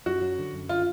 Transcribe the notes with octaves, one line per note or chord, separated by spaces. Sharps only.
F#2 F#4
F#3
D3
F#2
D3 F4